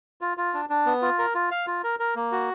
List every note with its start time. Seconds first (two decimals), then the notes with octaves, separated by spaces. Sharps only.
0.21 F4
0.37 F4
0.54 D4
0.69 D4
0.86 B3
1.02 F4
1.19 A#4
1.35 F4
1.51 F5
1.67 F4
1.84 A#4
2.00 A#4
2.16 A#3
2.32 F#4